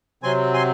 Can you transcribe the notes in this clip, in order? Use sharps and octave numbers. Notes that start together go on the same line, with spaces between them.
C3 F#3 C4 G#5 C6
G#5 C6